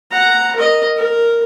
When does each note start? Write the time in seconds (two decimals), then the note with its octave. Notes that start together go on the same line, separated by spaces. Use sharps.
0.11 F#5 A#5
0.56 A#4 D#5
0.97 A#4